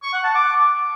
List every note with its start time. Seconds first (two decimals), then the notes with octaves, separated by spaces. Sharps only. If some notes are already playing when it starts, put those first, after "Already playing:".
0.03 C#6
0.13 F#5
0.24 A5
0.35 D6